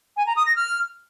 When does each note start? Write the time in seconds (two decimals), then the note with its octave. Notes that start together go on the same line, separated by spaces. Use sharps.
0.17 G#5
0.27 A#5
0.36 D#6
0.46 A#6
0.56 F6